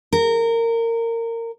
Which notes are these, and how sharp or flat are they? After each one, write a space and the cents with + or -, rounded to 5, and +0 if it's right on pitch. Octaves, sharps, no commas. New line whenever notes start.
A#4 -20